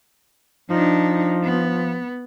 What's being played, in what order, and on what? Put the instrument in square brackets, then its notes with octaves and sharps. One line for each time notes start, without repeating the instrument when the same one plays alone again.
[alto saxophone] F3 [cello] D4 D#4
[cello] B3